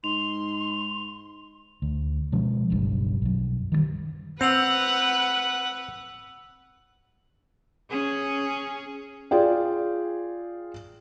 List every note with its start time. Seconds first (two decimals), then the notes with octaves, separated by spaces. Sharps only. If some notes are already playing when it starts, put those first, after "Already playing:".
0.04 G#2 C6 F7
1.82 D2
2.32 B2 F3 G#3 C#4
2.70 F#1 B1 G2
3.22 B1 F#2
3.72 D#3 E3 G3
4.41 C4 B4 F#5 E6 F7 F#7
7.90 C#4 G#4
9.31 F4 G#4 D5 G5